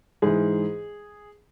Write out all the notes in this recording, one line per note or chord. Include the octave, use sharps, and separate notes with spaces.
G#2 E3 G#4